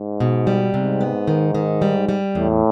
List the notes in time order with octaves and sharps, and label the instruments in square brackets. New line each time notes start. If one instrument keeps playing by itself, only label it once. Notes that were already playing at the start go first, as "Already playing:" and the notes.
Already playing: [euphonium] G#2
[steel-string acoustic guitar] B2
G3
[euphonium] G#2 [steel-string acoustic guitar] C3
[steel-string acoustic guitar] B3
D#3
D#3
G3
G3
[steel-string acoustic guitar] E2 [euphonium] A2